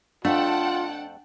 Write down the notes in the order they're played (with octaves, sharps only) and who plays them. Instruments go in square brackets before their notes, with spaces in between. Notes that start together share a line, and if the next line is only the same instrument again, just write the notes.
[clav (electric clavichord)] F2 A3 [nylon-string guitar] D4 [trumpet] F4 [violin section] F#5 G5 A5